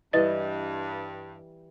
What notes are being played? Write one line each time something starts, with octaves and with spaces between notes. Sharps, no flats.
G2 E3 G3 B4 D#5 A6